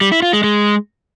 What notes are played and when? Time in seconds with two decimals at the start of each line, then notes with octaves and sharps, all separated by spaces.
0.01 G3
0.12 E4
0.22 F4
0.33 G#3
0.44 G#3